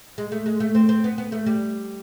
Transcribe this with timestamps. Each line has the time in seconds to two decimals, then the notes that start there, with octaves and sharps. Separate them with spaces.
0.18 G#3
0.32 A3
0.46 G#3
0.60 A3
0.75 C4
0.89 C4
1.04 B3
1.18 B3
1.32 A3
1.46 G3